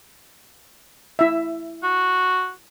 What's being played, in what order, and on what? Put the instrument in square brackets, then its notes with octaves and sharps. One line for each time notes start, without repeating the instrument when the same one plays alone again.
[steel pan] E4 E5
[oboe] F#4